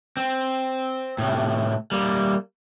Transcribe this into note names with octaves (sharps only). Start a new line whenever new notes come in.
C4
A2 C3
G3 A#3